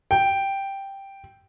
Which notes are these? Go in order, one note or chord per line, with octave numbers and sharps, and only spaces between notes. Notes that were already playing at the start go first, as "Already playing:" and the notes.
G5